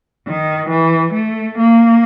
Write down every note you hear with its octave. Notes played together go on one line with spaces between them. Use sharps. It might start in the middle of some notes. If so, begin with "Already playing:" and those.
D#3
E3
A3
A#3